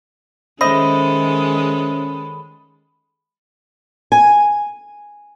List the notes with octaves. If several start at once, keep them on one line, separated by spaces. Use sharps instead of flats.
D#3 G#3 C#4 A4 C5 D#5 E5 B5
G#5